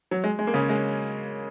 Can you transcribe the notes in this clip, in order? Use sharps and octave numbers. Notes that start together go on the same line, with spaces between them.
F#3
G#3
G#3
A#3
C#3 C#4
G#3